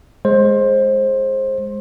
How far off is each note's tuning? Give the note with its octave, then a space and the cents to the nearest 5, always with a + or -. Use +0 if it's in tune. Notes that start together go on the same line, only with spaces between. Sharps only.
G#3 +0 C5 +20